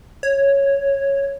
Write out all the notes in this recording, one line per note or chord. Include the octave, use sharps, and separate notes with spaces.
C#5